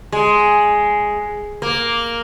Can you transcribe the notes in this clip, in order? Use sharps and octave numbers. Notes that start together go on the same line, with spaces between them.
G#3
A#3